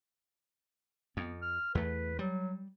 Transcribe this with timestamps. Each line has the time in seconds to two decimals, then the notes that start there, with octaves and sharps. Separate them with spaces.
1.17 F2 B3
1.42 F6
1.75 E2 A3 B4
2.19 F#3 G3